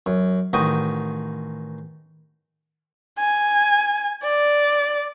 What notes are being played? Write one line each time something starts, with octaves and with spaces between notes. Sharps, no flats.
F#2
A1 D#3 F#4 G5 D#6
G#5
D5